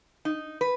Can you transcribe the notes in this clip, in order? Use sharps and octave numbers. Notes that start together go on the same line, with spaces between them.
D#4
B4